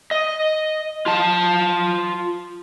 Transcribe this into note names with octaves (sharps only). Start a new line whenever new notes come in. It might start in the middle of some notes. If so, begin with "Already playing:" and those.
D#5
F4 A5